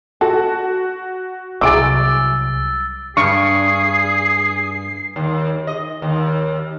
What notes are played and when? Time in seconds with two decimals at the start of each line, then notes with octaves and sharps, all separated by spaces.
0.21 F#4 A4
1.61 C2 F#3 E4 G#4 D6 E6 A6 D7
3.17 G2 G#4 C#6 C7
5.16 D#2
5.67 D#5
6.02 D#2